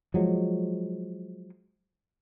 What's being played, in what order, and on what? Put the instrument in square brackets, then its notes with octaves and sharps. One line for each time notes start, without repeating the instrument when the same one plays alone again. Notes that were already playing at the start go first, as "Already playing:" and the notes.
[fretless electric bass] F3 F#3 G#3